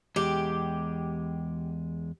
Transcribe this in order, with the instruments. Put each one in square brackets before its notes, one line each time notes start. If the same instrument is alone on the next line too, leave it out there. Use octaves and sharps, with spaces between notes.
[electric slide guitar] E2 G#3 [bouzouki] G4